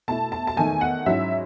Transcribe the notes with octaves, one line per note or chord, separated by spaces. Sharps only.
B2 A3 E4 A5
A5
A5
E2 D#3 A3 G#5
F#5
G#2 F#3 C#4 E4 E5